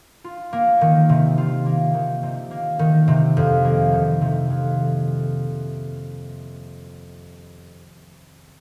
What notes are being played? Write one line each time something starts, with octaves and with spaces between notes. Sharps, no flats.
F4
A#3
D#3
C3
F4
A#3
D#3
C3
A#3
D#3
C3
F2
A#3
D#3
C3
F2